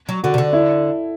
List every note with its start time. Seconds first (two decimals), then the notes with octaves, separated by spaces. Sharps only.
0.09 F#3
0.24 D3 F#4
0.34 C3
0.38 D3
0.53 E4